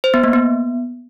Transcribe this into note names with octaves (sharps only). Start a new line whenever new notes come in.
C5
B3
A#3
B3